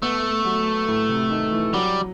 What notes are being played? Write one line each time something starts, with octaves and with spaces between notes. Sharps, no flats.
A3 B3
F#3
A2
C3
D#3
E3
F#3 G3